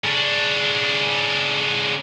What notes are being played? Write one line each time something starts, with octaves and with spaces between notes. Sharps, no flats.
C#3 D4